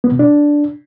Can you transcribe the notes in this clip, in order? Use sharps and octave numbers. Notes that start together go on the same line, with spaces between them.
B3
B2
D4